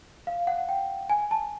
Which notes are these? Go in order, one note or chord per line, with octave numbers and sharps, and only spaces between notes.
F5
F#5
G5
G#5
A5